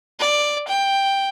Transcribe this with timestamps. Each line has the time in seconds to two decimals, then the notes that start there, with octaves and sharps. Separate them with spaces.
0.20 D5
0.68 G5